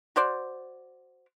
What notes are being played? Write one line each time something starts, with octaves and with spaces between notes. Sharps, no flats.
F#4 C5 D5